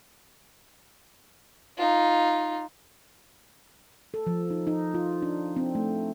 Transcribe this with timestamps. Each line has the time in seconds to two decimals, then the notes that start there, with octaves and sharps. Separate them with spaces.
1.78 D#4 F4
4.14 A4
4.27 F3
4.50 D#4
4.67 D#4
4.94 F4
5.22 D4
5.57 C4
5.75 A3